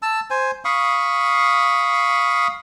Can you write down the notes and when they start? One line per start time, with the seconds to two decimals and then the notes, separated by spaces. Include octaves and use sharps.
0.02 A5 E6
0.30 C5 G#5
0.65 F5 B5 C#6 D#6